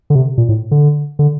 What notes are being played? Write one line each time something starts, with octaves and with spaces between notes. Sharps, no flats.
D3
C3
A#2
A2
D3
D3